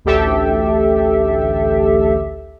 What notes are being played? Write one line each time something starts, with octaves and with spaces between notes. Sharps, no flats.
A1 D2 G4 A4 E5